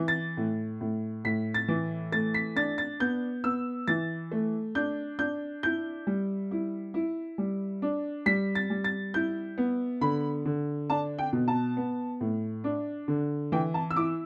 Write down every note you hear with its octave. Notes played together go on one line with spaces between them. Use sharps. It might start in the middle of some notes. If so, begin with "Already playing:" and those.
Already playing: E3
A6
A2
A2
A2 B6
A6
E3
A3 A6
B6
D4 A6
A6
B3 G6
B3 E6
E3 A6
A3
D4 G6
D4 G6
E4 G6
G3
E4
E4
G3
D4
G3 B6
A6
G3
A6
E4 G6
B3
D3 B5
D3
D4 A5
G5
B2
A5
B3
A2
D4
D3
E3 G5
A5
E6
E4 D6